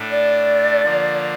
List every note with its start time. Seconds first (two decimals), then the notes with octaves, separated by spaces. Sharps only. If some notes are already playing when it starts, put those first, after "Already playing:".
Already playing: A2 A3 D4
0.11 D5
0.82 D3 F3 A#3